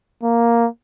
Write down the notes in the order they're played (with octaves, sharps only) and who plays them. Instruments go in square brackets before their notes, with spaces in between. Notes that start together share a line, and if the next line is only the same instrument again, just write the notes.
[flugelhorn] A#3